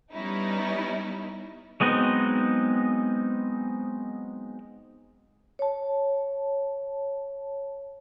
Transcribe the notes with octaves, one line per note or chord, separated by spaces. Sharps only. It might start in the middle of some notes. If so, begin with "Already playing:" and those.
G3 B3 C#4 D#4 E4
F#3 G#3 B3 C4 D#4
C#5 A5